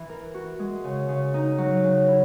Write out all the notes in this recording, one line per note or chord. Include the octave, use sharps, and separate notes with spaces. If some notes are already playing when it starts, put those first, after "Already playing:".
Already playing: E3
A#4
F#4
G#3
C#3
C#3
D#4
F#3
C#3
E4